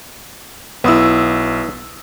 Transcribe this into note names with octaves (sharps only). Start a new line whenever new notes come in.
B1 B3 E4 D#6 E6